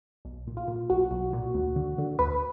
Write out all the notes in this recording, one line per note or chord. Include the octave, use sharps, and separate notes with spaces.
B1
A#2
F4
A#2
B1 F#4
B1
A#2
D2
D3
D3
D2 B4